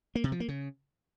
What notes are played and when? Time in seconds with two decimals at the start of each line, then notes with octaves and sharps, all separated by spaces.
0.15 A#3
0.24 C3
0.32 F3
0.40 A#3
0.48 C#3